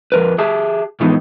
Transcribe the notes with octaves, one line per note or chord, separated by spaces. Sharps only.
F2 A#4 B4
G4 G#4 E5 A5
A2 E3 F3 G#3 B3 D#4